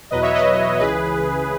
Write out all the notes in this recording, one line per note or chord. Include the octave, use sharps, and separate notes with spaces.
E2 B2 F#3 B4 D#5
C#5 E5
B4 D#5
C#2 C#3 E3 G#4 B4